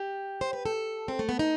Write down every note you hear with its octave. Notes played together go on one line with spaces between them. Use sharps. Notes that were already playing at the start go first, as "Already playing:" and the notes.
Already playing: G4
C5
B4
A4
C4
A3
B3
D#4